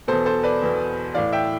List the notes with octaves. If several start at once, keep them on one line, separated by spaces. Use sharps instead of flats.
E2 B2 A4 C5
A4 C5
B4 D5
E2 B2
A2 E3 D5 F5
E5 G5